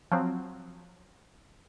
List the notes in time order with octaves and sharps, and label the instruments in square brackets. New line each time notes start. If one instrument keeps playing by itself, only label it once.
[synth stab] F3 F#3 C4